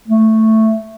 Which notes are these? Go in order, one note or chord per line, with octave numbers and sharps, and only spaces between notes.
A3